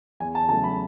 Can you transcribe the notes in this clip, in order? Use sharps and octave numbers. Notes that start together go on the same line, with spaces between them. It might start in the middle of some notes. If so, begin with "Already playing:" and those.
E2 G#5
A5
C#3 F#3 A3 A5
B5